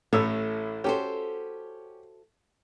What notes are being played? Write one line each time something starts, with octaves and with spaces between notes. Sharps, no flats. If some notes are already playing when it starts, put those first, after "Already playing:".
A1 A2 E4 A4 C#5 E6
C#4 F#4 G4 A4 C5